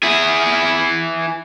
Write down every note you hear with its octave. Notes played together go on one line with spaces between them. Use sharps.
E4 G#4